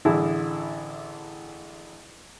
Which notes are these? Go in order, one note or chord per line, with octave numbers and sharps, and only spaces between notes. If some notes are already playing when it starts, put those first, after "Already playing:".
A1 D3 E4 G#4